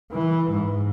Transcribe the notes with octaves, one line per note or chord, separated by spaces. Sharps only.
E3
G#2